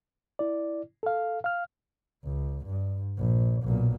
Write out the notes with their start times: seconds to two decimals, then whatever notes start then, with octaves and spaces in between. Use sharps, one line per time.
0.39 E4 D5
1.03 A4 F5
1.44 F5 F6
2.24 C#2
2.66 G2
3.18 A#1
3.63 B1 A#2